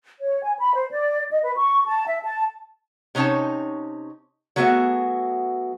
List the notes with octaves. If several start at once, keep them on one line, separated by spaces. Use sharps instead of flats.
C#5
G#5
B5
C5
D5
D#5
B4
C#6
A5
E5
A5
C3 C#4 D#4 C#5 A5
F#3 A3 B3 F#4 G#4 E5